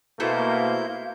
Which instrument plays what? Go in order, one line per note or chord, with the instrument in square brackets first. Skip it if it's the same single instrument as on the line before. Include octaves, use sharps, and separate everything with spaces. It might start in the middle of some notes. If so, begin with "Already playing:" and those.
[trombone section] B2 A#3 [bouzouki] A3 F#4 C5 [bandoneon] E4 G6 [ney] F5